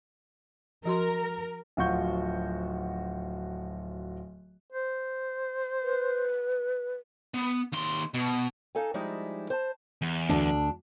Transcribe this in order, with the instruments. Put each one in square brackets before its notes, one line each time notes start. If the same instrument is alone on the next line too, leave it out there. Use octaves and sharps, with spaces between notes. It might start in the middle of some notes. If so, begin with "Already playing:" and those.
[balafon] F3 F#4 C6 [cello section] A#4
[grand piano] D1 F3 F#4 C#6 G6
[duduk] C5
[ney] B4
[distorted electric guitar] B3
D#2 C6
B2
[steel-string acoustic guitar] D#4 A4 F5 G#5
F3 G3 G#3 D#4 E4
C5 A5
[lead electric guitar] E2
[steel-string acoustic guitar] D2 D4